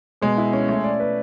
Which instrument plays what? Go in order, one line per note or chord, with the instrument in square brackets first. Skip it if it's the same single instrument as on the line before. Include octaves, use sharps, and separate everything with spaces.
[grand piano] B2 [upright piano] G#3
[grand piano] E4
C#4
A3
D5
B4